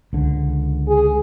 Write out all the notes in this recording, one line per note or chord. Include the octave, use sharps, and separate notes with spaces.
C#2 D3
G#4